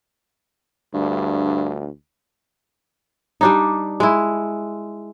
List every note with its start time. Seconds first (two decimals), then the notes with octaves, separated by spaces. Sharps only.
0.94 D2 G2
3.41 G3 D4 D#4
4.00 G#3 E4